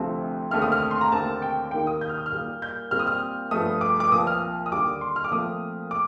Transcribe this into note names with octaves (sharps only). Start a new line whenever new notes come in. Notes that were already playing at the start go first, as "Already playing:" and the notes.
Already playing: D2 C3 F3 A3 C4
D#2 D3 A3 C4 F6
D#6
F6
C6
A#5
D#2 D3 A3 C4 A5
G5
D#2 D#3 A#3 G5
D#6
G6
F6
D#6
F6
A#2 G3 A#3
G6
A#2 G3 C4 F6
D#6
F6
G2 F3 A3 D#6
D6
D6
C2 A#2 F3 D#6
F6
D#6
D#2 D3 G3 D6
C6
F6
D6
A#2 F3 A3 C4 D#6
D6